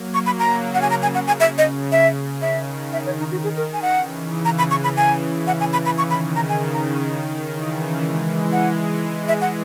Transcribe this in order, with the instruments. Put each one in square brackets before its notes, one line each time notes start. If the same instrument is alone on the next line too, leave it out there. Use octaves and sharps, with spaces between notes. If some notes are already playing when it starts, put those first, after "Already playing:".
Already playing: [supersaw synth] F#3 A#3
[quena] C#6
B5
[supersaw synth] C#3 [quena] A#5
[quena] F#5
G#5
A#5
G#5
F#5
G#5
E5
D#5
E5
[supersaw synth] D#3 [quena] E5
[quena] E5
C#5
D#4
F#4
[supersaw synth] D#3 [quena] G#4
[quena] A#4
G#5
F#5
[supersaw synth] C#3 E3
[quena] A#5
B5
C#6
B5
G#5
F#5
G#5
B5
B5
[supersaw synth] D#3 [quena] C#6
[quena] B5
A#5
[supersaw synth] C#3 [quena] G#5
[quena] A#5
[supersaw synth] D#3
C#3 E3
E3 G#3
[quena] F#5
[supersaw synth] E3 G#3
[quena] E5
F#5